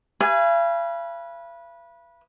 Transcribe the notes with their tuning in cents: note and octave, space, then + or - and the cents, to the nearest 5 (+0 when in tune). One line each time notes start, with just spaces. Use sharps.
B4 -20 F5 -45 G#5 -5